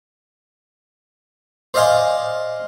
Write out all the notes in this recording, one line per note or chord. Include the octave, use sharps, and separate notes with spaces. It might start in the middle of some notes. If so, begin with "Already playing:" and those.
C5 D5 D#5 F5 G#5 C6